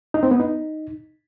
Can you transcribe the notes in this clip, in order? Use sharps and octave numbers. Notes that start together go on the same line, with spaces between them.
D#4
C4
B3
D#4